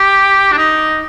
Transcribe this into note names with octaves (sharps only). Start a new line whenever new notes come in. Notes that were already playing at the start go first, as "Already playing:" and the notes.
Already playing: G4
D4
D#4